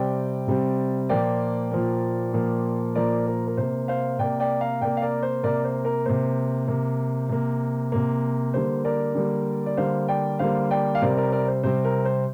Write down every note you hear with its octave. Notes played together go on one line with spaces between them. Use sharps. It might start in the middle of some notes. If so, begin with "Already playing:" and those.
Already playing: C3 G3 C4 D5 G5
C3 G3 C4
A#2 F3 A#3 D5 G5
A#2 F3 A#3
A#2 F3 A#3
A#2 F3 A#3 A#4 D5
A#4
A#4
C3 A#3 C5
C5 F5
C3 A#3 D5 G5
D5 G5
F5 A#5
C3 A#3 D5 G5
F5
A#4 D5
C5
C3 A#3 A#4 D5
C5
A#4
C3 A#3 C5
C3 A#3
C3 A#3
C3 A#3
D3 G3 A#3 C5
A#4 D5
D3 G3 A#3
D5
D3 G3 A#3 C5 F5
D5 G5
D3 G3 A#3 C5 F5
D5 G5
F5
C3 G3 C4 A#4 D5
A#4 D5
A#4 D5
C5
C3 G3 C4 C5
A#4
C5